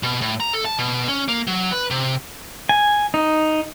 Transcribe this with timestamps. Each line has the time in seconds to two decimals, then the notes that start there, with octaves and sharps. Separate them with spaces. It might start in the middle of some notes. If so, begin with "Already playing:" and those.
0.03 B2
0.21 A2
0.40 A#5
0.53 A4
0.65 A5
0.79 B2
1.08 C#4
1.28 A#3
1.47 F#3
1.72 B4
1.91 C3
2.69 G#5
3.14 D#4